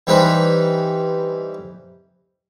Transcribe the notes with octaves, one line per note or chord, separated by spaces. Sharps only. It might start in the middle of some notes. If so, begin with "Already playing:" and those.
E3 G3 C4 D#4 B4